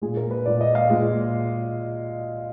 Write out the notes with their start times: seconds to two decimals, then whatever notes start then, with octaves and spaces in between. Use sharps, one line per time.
0.02 A#2 G#3 G#4
0.17 A#4
0.31 B4
0.46 A#2 G#3 D5
0.61 D#5
0.75 F5
0.90 A#2 G#3